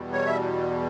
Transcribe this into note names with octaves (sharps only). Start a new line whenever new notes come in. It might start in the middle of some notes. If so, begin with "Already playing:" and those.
Already playing: E2 B2 G3
C#5
E5